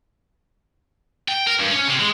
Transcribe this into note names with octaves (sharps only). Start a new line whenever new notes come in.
G5
A#4
G2
C#4
C3
G#3